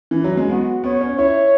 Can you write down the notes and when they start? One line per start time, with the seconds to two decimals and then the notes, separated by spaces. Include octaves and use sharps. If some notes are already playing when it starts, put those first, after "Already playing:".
0.11 E3
0.24 F#3
0.37 G#3
0.49 B3 F#4
0.84 B3 C#5
1.01 C#4
1.18 E4 C#5